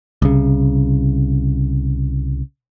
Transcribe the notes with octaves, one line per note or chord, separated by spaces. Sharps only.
C2 C#3